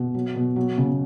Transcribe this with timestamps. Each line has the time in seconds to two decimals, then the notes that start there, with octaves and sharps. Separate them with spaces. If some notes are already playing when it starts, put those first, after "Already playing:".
Already playing: B2
0.14 F#3
0.35 B2
0.56 F#3
0.78 C#3